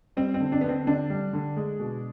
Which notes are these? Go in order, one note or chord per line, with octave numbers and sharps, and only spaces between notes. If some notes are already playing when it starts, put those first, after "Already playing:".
G3 C4
C4
D3
D4
D3 B3
C4
D3 D4
G3
D3
G#3
B2